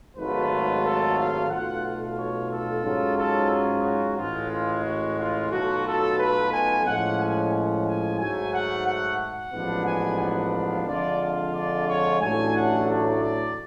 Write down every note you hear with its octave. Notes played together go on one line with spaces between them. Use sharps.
G#1 G#2 F#3 A3 F4 B4
A4
F5
B1 B2 A3 F4 F#5
F5
C#5
A4
G#2 F#3 C#4 F4
A4
G#4
F#4
A1 A2 G#3 F4
F4
F#4
F4
B1 B2 F#3 A3 F4 F#4
A4
B4
G#5
A2 F3 G#3 C#4 F#5
G#5
F#5
G#5
G#2 F#3 A3 G#5
F#5
F#5
F#5
A1 G#2 F3 B3 D4
G#5
F#5
F5
F2 D3 G#3 D4 F4 D5
F5
D5
C#5
A1 A2 F#3 A3 D4 G#5
F#5
D5
D5